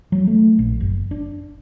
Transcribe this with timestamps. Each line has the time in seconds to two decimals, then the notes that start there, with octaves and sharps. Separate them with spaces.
0.12 F#3
0.27 A3
0.59 A#1
0.80 F#1
1.11 D4